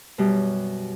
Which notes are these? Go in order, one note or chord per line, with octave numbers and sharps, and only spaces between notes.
F#2 B2 G3